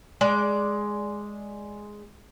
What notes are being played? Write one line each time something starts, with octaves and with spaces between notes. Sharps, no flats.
G#3 D5